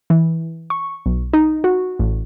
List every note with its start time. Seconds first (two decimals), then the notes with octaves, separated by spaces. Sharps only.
0.10 E3
0.70 C#6
1.06 B1
1.33 D#4
1.64 F#4
2.00 A1